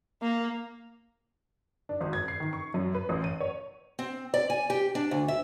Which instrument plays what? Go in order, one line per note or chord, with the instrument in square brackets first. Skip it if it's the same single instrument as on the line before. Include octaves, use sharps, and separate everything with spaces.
[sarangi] A#3
[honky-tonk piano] D4
G#1
G#6
C7
D#3
C#6
F#2
B4
A1
D#7
C#5
[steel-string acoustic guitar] C4
D5
G#5
G4
D4
D2
E5